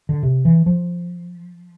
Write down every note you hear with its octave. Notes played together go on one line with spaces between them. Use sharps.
D3
C3
E3
F3